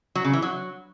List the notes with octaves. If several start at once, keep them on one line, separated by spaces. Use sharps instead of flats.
F#3
C#3
E3
F#3